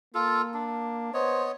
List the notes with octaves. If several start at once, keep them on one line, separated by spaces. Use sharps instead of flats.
A#3 F4 A4
D4
B3 C5 C#5 D#5